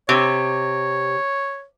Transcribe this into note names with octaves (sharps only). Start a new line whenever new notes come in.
C3 C#5